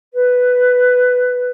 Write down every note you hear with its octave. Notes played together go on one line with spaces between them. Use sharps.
B4